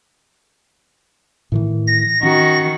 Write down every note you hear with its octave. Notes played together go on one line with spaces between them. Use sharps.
A2 D#3 E3
A#6
D#3 C#4 F#4